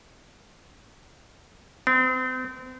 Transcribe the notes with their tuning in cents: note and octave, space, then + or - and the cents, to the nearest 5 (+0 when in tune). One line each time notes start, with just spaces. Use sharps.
C4 -35